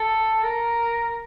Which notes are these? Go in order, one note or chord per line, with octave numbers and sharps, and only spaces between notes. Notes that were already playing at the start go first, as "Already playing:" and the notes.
Already playing: A4
A#4